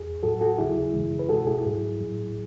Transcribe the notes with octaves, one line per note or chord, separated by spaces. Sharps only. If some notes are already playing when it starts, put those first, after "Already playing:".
Already playing: E2 G#4
A2 F#3 F#4 A4
F#4 A4
D#2 C#3 F#3 E4 G#4
F#2 C#3 E3 G#3
B4
C#2 B2 G#3 F#4 A4
E4 G#4
G#2 F#3
A2 F#3